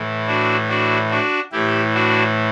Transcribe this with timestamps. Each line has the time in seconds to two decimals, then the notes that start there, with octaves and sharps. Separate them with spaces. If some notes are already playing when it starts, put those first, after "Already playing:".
Already playing: A2 E3
0.27 D4 F#4
0.69 D4 F#4
1.10 D4 F#4
1.52 A2 E3 E4 G4
1.94 D4 F#4